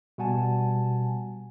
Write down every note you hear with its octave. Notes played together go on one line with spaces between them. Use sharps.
B2 G3 F#5 G#5 A5